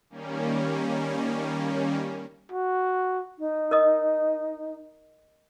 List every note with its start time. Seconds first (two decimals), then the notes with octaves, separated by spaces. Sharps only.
0.10 D#3 G3 A#3 C#4
2.52 F#4
3.38 D#4
3.71 A#4 D#5 D#6